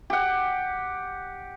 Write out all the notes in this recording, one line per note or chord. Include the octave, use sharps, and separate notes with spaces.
G4 F#5